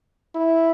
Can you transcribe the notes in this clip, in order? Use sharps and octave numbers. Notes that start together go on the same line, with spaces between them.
E4